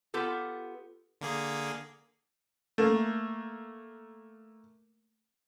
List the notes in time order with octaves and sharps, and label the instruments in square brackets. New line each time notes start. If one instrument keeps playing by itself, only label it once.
[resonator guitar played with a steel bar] B3 F4 G4 A4
[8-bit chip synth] D3 A#3 G#4
[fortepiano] A3 A#3